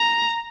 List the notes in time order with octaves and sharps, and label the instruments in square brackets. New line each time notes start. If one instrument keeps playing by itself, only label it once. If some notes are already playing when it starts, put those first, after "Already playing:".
Already playing: [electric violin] A#5